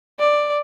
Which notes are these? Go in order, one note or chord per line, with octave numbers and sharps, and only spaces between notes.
D5